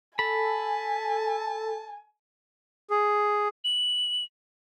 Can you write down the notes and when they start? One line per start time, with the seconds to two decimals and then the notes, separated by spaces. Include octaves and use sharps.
0.19 A4 G#5 A5 B5
2.91 G#4
3.64 F#7